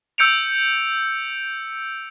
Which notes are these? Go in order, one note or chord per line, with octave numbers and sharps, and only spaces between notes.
E6 G6 C#7 D7 F7